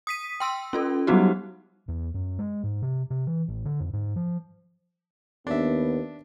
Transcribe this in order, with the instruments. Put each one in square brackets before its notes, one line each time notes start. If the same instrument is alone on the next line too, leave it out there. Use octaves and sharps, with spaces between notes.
[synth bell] D#6 B6 D#7
G5 C6 E6
C#4 F4 A4
F#3 G3 B3 D#4 F#4 G4
[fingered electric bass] E2
F#2
G#3
G#2
C3
C3
E3
A1
D3
F2
G#2
F3
[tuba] D#2 [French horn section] B3 [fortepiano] D4 E5